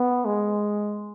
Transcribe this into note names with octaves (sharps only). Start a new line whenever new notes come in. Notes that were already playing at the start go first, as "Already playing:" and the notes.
Already playing: B3
G#3